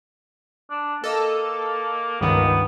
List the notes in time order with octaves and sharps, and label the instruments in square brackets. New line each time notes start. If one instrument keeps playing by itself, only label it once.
[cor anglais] D4
[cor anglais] A#3 [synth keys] A4 D#5
[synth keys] C#2 G2 D#3 [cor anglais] B3